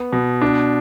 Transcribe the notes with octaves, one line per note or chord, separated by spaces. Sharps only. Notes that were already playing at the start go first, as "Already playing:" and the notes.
Already playing: B3
B2
D4